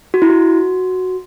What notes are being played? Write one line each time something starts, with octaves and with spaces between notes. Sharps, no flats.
F#4
E4
F#4